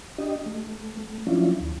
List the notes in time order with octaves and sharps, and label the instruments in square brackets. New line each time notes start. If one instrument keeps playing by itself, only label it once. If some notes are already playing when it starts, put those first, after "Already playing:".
[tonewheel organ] D4 G4 D#5
A3
A3
F3 F#3 C#4 D4 E4 F4
D#2